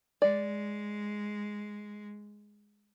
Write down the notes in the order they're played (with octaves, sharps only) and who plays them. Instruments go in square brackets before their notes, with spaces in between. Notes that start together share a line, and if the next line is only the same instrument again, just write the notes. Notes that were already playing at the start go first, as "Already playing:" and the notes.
[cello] G#3 [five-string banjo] D5